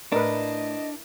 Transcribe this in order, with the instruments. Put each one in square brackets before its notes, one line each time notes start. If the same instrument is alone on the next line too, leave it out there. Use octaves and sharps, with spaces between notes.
[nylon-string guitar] A2 [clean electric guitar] D4 [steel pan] A#4 B4 [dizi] D#5